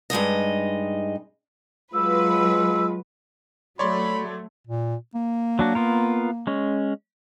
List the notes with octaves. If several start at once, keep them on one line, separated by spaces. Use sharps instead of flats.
G2 G#3 D#4 D#5
F#3 G#3 F4 B4 E6
F#3 A3 C#5 D5 B5 C6
A#2
A#3
F#3 D4 F#4
B3 F4 A#4
G#3 C#4